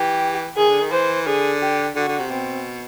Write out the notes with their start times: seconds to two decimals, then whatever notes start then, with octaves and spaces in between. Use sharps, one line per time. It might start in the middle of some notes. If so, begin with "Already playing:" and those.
Already playing: E3 G4
0.57 D#3 G#4
0.69 D3
0.81 D#3
0.92 E3 C5
1.26 D3 G#4
1.62 G4
1.96 D3 F#4
2.08 D3
2.19 C3
2.30 B2 C4